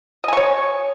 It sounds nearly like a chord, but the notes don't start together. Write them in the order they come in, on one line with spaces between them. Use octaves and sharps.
D#5 G#5 C#6 C#5